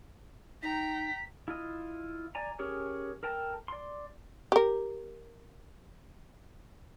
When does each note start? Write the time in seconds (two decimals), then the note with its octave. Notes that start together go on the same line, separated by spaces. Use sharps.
0.63 D#4 G5 A#5 B6
1.48 E4 F4 D#5
2.35 D5 G#5 A#5
2.59 C#4 G4 G#4 A#4 C#5
3.23 A4 A#4 G5 A5
3.68 D5 C6
4.52 G4 A#4